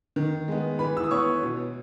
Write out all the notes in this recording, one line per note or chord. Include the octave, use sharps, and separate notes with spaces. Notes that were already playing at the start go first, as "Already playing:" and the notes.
D#3
G#3 B3
E3 B4 B5
E6
D#6
B3 C#5 C#6
B2